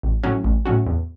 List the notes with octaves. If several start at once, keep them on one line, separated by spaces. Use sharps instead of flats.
A1
A2 F#3 C#4 F#4
A1
A2 F#3 C#4 F#4
E2